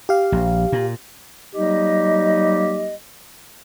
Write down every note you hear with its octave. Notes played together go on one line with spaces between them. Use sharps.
G4 F5
A#1
A#2
F#3 G3 A#3 D#4 G4 D#5